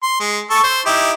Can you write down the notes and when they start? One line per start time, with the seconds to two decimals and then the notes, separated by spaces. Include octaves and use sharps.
0.03 C6
0.20 G#3
0.50 A4 C#6
0.64 C5
0.86 D#4 E4 G4